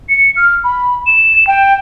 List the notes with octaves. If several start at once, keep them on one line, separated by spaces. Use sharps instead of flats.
C#7
F6
B5
E7
G5